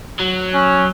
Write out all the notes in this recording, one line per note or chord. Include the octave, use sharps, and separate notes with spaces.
F#3
C#4